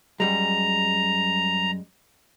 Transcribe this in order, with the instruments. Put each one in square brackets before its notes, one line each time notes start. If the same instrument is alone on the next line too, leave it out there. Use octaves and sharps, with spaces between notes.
[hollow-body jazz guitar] F#2 G3 G#3 [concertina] A#5